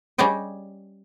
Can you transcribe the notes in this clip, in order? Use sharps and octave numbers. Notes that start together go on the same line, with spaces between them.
G3 C#4 G#4 D5 D#5 G5